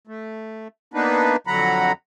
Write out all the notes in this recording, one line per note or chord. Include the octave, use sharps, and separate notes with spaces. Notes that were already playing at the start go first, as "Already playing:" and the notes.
A3
A#3 B3 D4 D#4 B4
F2 D3 F#3 F#5 A#5 B5